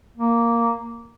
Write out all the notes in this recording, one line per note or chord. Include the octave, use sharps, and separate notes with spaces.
A#3